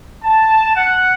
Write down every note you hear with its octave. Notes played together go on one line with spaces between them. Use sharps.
A5
F#5